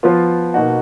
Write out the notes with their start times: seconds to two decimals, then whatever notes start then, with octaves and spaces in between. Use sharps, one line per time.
0.03 F3 B3 F4
0.54 B2 A#3 D#4 F#4